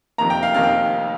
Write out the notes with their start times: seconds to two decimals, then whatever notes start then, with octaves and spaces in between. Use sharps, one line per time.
0.18 F1 F2 D#3 A#3 A#5
0.30 G5
0.43 F5
0.54 F1 F2 D#3 A#3 F5
0.63 G5